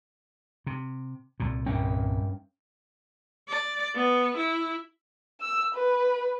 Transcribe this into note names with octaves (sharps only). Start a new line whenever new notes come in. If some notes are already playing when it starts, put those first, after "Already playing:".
C3
C2 A#2
G2 C#4 G5
D5
B3
E4
E6
B4